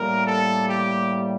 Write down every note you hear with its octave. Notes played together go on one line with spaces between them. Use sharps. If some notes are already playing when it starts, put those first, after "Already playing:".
Already playing: A2 G3 A#3 A#4
A4
G4